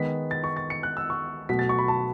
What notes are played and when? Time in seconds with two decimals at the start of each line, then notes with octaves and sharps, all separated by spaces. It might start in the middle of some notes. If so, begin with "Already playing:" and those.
Already playing: D#3 G#3 B3 B6
0.31 A6
0.44 C#6
0.57 A6
0.70 C#7
0.83 F#6
0.97 E6
1.10 C#6
1.49 B2 F#3 A3 B6
1.59 A6
1.69 C#6
1.79 B5
1.88 A5